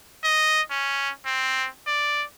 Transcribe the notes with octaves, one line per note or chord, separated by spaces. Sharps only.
D#5
C#4
C4
D5